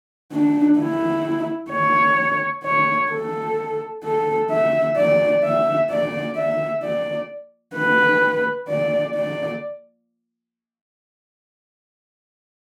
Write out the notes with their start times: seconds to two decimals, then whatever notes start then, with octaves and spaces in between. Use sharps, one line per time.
0.32 D4
0.79 E4
1.72 C#5
2.65 C#5
3.11 A4
4.04 A4
4.51 E5
4.97 D5
5.44 E5
5.91 D5
6.36 E5
6.83 D5
7.76 B4
8.69 D5
9.15 D5